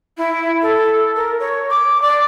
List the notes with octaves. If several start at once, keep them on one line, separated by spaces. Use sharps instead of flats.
E4
A4
A#4
C#5
D6
D5